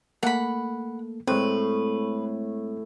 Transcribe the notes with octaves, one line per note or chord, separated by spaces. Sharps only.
A3 A#3 A4 F#5 B5
A2 G#3 C4 B4